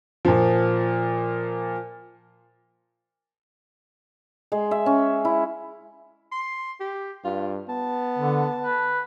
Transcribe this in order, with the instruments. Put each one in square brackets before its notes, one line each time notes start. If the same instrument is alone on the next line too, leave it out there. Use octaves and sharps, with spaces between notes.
[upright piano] A#2 F3
[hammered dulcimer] G#3
E5
C#4
E4
[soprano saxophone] C6
G4
[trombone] G2 [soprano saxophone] F4
[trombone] B3 [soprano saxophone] A5
[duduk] D3
B4